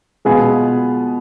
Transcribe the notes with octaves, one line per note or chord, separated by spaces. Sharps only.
B2 G#3 B3 F4 G#4